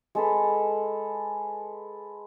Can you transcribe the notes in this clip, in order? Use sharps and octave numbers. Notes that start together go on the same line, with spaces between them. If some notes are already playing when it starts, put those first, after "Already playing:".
G#3 A4 B4